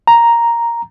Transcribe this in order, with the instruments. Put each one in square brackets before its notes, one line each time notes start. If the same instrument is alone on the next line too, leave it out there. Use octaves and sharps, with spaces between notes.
[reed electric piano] A#5